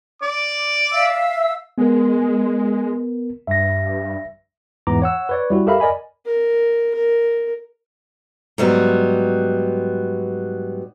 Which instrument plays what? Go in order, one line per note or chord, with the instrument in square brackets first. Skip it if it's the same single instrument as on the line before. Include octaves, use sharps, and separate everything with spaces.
[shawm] D5 [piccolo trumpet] D6
[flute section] E5 F5 E6
[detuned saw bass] G#3 [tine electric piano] B3 A#4
[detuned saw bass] G2 [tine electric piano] E5 A#6
[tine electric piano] E2 G#2 E3 B3 A#5 D6
C#5 F#5 E6
B4 C#5 D5
G3 E4 F#4
G4 A4 A#4 E5 F5 B5
A#4 D5 D#5 G#5 B5
[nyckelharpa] A#4
A#4
[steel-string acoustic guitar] G#2 F#3 G3 B3